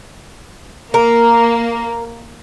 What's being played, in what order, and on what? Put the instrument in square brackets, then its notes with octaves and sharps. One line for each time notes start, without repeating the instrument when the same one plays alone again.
[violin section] A#3 [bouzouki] A#4